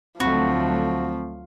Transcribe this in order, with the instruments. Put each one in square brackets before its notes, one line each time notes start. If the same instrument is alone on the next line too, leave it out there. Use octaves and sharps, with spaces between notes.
[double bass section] D2 F#3 A3 [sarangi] F3 [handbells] C4 B5 C#6 [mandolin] F#4